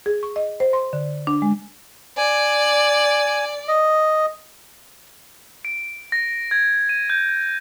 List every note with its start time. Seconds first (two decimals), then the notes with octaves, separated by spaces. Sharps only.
0.06 G#4
0.23 C#6
0.36 D#5
0.60 C5
0.73 C6
0.93 D3
1.27 D4
1.42 G#3
2.17 D5 G#5
3.68 D#5
5.65 D7
6.12 A#6
6.51 G#6
6.89 D#7
7.10 G6